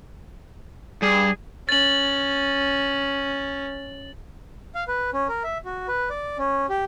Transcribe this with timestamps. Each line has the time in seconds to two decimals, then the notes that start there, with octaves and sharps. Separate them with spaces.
1.02 G2 G#4
1.69 C#4 A6 F#7
4.75 F5
4.88 B4
5.14 C#4
5.29 A#4
5.44 E5
5.65 F#4
5.88 B4
6.10 D5
6.38 C#4
6.69 G4